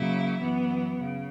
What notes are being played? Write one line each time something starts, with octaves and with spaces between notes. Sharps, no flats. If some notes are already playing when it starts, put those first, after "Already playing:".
Already playing: C#3 F#3 A#3 E4
F#2 E3 B3
C#3